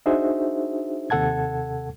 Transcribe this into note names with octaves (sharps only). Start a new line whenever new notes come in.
D4 D#4 F#4 G#4 C5 E5
D#2 C3 A4 F#5 A5 G#6